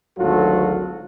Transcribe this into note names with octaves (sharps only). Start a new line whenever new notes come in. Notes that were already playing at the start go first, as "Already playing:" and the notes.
G#1 D2 F#3 F4 F#4 A4